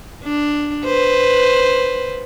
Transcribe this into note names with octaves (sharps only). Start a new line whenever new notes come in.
D4
B4 C5